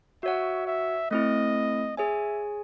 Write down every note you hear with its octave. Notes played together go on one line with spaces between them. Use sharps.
F#4 C#5 E5 F#5
E5
A3 C4 E4 D#5
G#4 C#5 E5 G#5